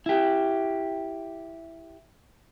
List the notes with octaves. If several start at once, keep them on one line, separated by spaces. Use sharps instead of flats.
E4 G4